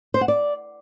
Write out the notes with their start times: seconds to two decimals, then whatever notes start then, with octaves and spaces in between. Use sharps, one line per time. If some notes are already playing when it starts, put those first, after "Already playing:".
0.14 C5
0.21 F#5
0.28 D5